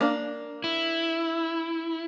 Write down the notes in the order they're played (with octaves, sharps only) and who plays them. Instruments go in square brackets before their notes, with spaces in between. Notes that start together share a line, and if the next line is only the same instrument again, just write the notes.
[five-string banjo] A#3 D4
[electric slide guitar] E4